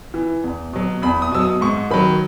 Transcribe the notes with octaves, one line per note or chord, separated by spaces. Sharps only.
E3
E2
B2 F#3
E2 B5
D#6
B2 F#3 E6
D#6
G#2 C#6
D#3 F#3 B5